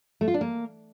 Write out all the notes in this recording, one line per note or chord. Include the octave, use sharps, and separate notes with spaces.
A3
F4
D4
A#3